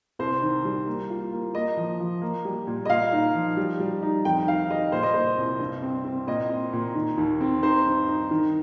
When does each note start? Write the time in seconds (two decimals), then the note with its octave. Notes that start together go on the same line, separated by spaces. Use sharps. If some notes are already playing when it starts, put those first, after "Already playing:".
0.19 C2 C5
0.42 D#3
0.65 G3
0.87 A#3
1.10 F4
1.32 A#3
1.55 A#3 D#5
1.77 F3
2.00 F3
2.22 A#3
2.45 G3
2.67 A#2
2.85 D#5
2.89 A#2 F5
3.12 D#4
3.35 F3
3.57 G3
3.80 G3
4.03 D#4
4.25 F2 G5
4.47 D#3 F5
4.70 G3 D#5
4.92 A#2 C5
5.03 D#5
5.14 A#2 C5
5.38 C2
5.60 G2
5.83 C4
6.05 C4
6.27 A#2 D#5
6.50 C4
6.73 A#2
6.95 D#3
7.18 D#2
7.41 C4
7.63 D#4 C5
7.86 G2
8.08 D#4
8.31 D#3